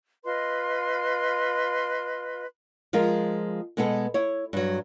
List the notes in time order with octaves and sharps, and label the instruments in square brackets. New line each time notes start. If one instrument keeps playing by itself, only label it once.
[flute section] F4 B4 D#5 C6
[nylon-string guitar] F3 G#3 F4 A#4
B2 G#3 B3 G#4 A4
E4 C#5
G2 F#3